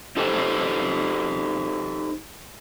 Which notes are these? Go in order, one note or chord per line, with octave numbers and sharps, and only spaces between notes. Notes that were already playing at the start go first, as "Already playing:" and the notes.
D#4 G4 A4 C5